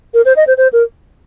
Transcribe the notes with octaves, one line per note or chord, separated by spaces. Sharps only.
A#4
C5
D#5
C5
C5
A#4